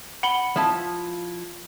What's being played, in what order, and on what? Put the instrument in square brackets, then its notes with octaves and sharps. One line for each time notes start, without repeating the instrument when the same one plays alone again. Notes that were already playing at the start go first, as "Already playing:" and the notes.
[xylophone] F#5 B5 G7
[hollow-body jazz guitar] F3 E4 A5